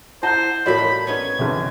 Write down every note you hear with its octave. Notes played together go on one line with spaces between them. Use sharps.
E4 C5 D#5 F#5 A5 G6
A2 G3 A#3 F#4 C#5 D#5 B5
B3 C#4 D#4 G#6
G1 C3